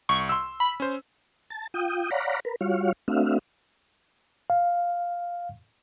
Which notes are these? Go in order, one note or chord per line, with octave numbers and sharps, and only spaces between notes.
C2 C#6
C6 E6
B5
C#4 C5
A5
F4 G5 D#6
C#5 D5 F5 F#5 A#5 B5
A#4 B4
G3 F4 F#4 C#5 F5
A3 C4 D4 F#4 E5 F5
F5